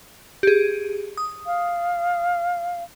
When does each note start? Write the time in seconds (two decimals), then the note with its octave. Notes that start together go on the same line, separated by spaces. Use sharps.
0.43 G4 G#4
1.17 D#6
1.46 F5